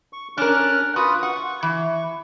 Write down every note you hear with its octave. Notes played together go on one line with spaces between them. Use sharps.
C#6
C#4 D4 A#4 F6 F#6
F4 F#4 B4 D#6
F#5 C#6
E3